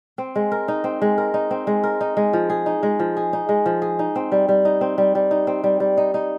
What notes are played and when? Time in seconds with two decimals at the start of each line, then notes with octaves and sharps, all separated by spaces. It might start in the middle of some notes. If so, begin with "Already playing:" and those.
0.18 C4
0.36 G#3
0.52 A#4
0.68 D#4
0.84 C4
1.01 G#3
1.18 A#4
1.34 D#4
1.51 C4
1.67 G#3
1.84 A#4
2.01 D#4
2.17 G#3
2.33 F3
2.50 G#4
2.66 D#4
2.83 G#3
2.99 F3
3.17 G#4
3.33 D#4
3.49 G#3
3.66 F3
3.82 G#4
3.99 D#4
4.16 C4
4.32 G3
4.49 G3
4.65 D#4
4.81 C4
4.98 G3
5.15 G3
5.31 D#4
5.47 C4
5.64 G3
5.80 G3
5.97 D#4
6.14 D#4